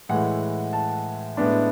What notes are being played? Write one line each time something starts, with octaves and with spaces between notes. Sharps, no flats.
A2 E3 G#3 F#5
A5
A2 G#3 B3 D4